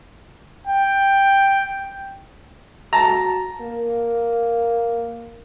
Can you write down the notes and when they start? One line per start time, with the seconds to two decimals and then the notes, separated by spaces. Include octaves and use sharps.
0.67 G5
2.93 F#4 A5 A#5
3.61 A#3